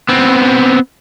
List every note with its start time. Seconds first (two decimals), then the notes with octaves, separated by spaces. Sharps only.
0.09 B3 C4